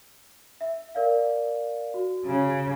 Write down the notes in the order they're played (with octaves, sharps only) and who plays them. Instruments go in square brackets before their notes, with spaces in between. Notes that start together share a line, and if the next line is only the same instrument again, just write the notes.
[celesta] E5
A#4 D5 F5
F#4
[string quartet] C#3